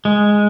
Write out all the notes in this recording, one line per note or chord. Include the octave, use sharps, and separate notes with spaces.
G#3